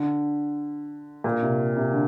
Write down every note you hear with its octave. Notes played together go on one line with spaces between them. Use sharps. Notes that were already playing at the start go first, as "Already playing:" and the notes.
Already playing: D3
A#2
C3
C3
D3